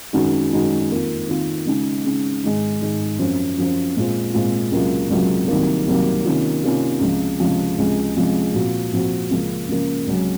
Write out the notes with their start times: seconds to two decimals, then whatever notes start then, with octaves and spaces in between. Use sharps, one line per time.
0.13 F#2 D#3 G#3 D#4 F#4
0.52 F#2 D#3 G#3 D#4 F#4
0.90 F2 D#3 A#3 F4
1.28 F2 D#3 A#3 F4
1.66 C#3 G#3 D#4
2.04 C#3 G#3 D#4
2.43 G#2 D#3 G#3
2.81 G#2 D#3 G#3
3.19 F#2 F3 C4
3.58 F#2 F3 C4
3.96 A#2 G#3 C4 F4
4.33 A#2 G#3 C4 F4
4.72 C#2 C3 F#3 A#3 F4
5.10 C#2 C3 F#3 A#3 F4
5.48 C2 C3 D#3 F#3 A#3
5.87 C2 C3 D#3 F#3 A#3
6.25 C3 D#3 A#3 C#4 F4
6.63 C3 D#3 A#3 C#4 F4
7.01 C#2 C3 F3
7.40 C#2 C3 F3
7.78 C#2 C3 F3 G#3
8.17 C#2 C3 F3 G#3
8.54 A#2 F3 C4 F#4
8.93 A#2 F3 C4 F#4
9.30 C#2 C#3 F3 A#3
9.69 C#2 C#3 F3 A#3
10.07 C#2 C3 F#3 C#4